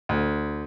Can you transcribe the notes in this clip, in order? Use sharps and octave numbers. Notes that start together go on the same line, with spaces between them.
D2